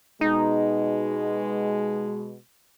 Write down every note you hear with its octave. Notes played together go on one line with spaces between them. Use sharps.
B2 G#3 D#4